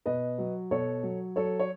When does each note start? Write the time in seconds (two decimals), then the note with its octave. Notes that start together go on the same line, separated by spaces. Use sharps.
0.06 B2 B4 D#5
0.38 F#3
0.71 B2 A4 C#5
1.03 F#3
1.36 F#3 A4 C#5
1.60 C#5